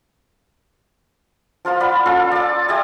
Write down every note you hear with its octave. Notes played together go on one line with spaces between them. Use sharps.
F3 F4 A#4 A5
D5 F#5 B5
C#4 F4 A4
D5 A5
G4 D5 E5 G#5